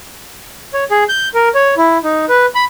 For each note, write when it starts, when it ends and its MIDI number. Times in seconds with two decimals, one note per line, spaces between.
0.74 0.84 73
0.91 1.04 68
1.09 1.28 91
1.34 1.49 70
1.55 1.75 73
1.77 1.98 64
2.03 2.25 63
2.29 2.46 71
2.55 2.64 83